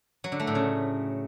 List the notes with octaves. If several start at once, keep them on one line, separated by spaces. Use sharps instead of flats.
F#3
D3
A3
A2
C#3